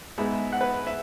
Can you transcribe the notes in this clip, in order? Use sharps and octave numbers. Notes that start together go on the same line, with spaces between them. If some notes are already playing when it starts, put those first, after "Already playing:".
G#2 G#3 B3 E5
F#5
B4
E5